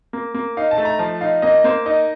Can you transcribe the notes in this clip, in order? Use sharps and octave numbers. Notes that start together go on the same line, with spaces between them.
A#3
A#3
D#4 F5
A5
A3
A#5
F3 A5
D#4 F5
A#3 D#5
A#3 C5
D#4 D#5